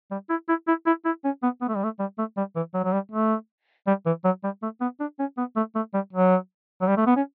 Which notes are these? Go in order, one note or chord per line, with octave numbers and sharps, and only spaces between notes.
G3
E4
E4
E4
E4
E4
C#4
B3
B3
A3
G3
A3
G3
A3
G3
E3
F#3
F#3
G3
A3
G3
E3
F#3
G3
A3
B3
D4
C#4
B3
A3
A3
G3
F#3
F#3
G3
A3
B3
C#4